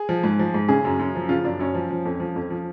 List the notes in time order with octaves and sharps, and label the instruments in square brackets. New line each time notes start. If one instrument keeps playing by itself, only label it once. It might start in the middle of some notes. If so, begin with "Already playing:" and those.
Already playing: [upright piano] G#4
F3
G#2
F3
G#2
C#3 G#4
F#2
F#2
F3
C#3 F4
F#2 D4
F#2 C#4
F3
F3
F2
F3
F2
F3